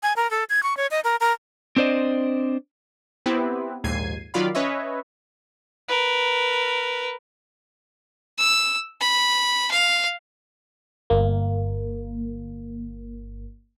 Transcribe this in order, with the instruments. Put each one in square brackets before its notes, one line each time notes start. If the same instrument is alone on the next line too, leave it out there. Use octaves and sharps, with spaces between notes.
[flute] G#5
A#4
A4
G#6
C#6
C#5
D#5
A#4
A#4
[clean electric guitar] C4 D4 C5 D5 D#5
[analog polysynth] B3 C4 E4 G4 B4
A#1 D#2 G#2 G#6 C7 D#7
D#3 F#3 F4 D5 F5 B5
C#4 B4 C#5 D#5 E5
[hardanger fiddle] A#4 B4
[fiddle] E6
B5
F5
[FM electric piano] G1 A#3